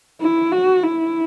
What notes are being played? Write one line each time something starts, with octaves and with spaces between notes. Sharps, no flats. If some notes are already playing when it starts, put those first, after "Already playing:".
E4
F#4
E4